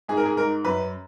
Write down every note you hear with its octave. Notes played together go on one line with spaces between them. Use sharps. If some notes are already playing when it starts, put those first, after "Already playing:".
G#2 G#4
A#4
G#4
G#2 A#4
F#2 B4